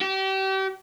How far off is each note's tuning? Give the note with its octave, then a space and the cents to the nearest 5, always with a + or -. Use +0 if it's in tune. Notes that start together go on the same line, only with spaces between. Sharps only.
G4 -35